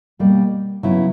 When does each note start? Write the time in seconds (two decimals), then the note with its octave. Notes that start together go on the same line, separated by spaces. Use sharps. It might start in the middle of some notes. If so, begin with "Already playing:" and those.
0.19 B2 G3 A#3
0.83 C#3 F#3 B3 E4